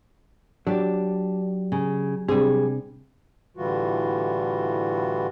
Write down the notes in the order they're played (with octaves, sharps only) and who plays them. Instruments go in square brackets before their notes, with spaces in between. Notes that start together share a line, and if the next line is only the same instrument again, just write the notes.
[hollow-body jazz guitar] F#3 G4 D5 [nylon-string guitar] D4
[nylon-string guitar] C#3
[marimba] C3 C4 D4 [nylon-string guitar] G3 G#4
[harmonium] A2 D3 E3 G3 F4 F#4